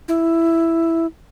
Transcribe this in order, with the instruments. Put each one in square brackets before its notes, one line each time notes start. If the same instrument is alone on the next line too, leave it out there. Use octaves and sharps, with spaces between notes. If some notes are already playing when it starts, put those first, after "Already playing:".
[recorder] E4